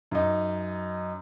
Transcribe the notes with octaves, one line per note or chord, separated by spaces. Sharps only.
F#2 D#4